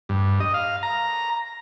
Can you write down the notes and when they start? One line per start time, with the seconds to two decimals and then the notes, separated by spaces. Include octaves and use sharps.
0.09 G2
0.40 D#5
0.54 F5
0.83 A#5